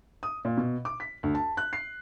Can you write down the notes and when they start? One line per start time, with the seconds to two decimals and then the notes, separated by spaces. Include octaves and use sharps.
0.23 D#6
0.45 A#2
0.57 B2
0.85 D6
1.00 B6
1.23 D2
1.35 A5
1.57 F#6
1.73 C7